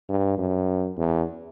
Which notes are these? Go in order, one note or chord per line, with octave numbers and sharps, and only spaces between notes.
G2
F#2
E2